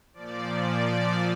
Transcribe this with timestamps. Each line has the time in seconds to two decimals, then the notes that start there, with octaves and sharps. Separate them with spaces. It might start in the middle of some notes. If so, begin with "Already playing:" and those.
0.14 A#2 F3 D5
0.52 D5